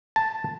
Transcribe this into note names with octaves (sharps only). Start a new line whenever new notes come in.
A5